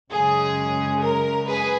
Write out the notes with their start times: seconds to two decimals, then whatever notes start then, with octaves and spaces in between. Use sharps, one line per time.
0.12 F#2 C#3 G#3 G#4
1.01 A#4
1.46 G#4 B4